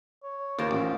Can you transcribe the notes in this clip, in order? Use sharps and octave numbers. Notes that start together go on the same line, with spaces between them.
C#5
D#2 F4 A#4 C5
A1